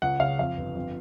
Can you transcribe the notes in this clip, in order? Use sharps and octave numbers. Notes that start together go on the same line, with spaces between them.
C#2 F#5
C#3 F5
F2 F5
G1
F2